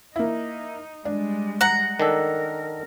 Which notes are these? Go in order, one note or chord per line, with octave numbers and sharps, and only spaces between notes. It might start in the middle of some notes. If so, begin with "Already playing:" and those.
A#3 D#4 E4
G3 G#3 D4
F#5 A#5 F#6 C#7
D#3 D4 A4 A#4